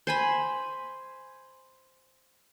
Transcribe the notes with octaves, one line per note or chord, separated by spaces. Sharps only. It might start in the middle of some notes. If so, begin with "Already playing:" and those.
C5 G#5 B5